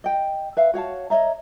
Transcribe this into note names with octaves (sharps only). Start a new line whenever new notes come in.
D#5 G5
B4 E5 F5
F#4 C#5 F5 A5
C#5 D#5 E5 A#5